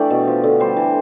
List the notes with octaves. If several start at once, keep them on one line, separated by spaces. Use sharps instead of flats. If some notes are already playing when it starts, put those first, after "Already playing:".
Already playing: E3 A3 D4 D5 G5
B2
F3
D3
G3 C5
E3